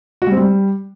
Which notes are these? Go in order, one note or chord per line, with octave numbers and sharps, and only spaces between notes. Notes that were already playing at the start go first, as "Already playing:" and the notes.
F#4
G3
C4
G3